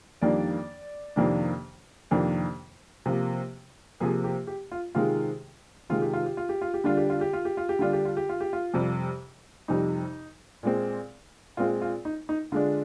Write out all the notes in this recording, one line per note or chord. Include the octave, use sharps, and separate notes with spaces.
F2 D#3 G3 A#3 D4 D5
F2 C3 D#3 A#3 D4
F2 C3 D#3 A#3 D4
C3 F3 A#3
C3 F3 A#3 G#4
G4
G4
F4
C3 D#3 G#3 F4
C3 D#3 G#3 F4
G4
F4
G4
F4
G4
F4
G4
D3 G3 D4 F4
G4
F4
G4
F4
G4
F4
G4
D3 G3 D4 F4
G4
F4
G4
F4
G4
F4
F2 C3 G3
F2 C3 G3 D#4
A#2 G#3 C4
A#2 G#3 C4 F4
F4
D#4
D#4
D3 G#3 D4 F4